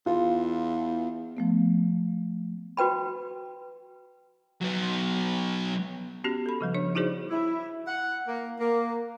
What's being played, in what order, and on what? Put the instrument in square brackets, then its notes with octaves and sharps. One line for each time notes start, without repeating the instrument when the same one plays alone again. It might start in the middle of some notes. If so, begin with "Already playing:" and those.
[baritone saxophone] E2 [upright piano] F4
[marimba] F3 A3 B3
[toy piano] F#4 B4 G5 B5
[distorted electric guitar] F#3 B3
[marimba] B3 C#4 F#4 G4
A4 B5
C#3 F3 G3
D4 C#5
D#4 E4 F#4 G#4 C5 D5
[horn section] E4
F#5
A#3
A#3